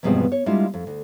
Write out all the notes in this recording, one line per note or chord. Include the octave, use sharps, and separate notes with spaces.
E2 G2 B2 F3 G#3 C4
C#5
G3 G#3 A#3 D4 E4 F4
F2
D2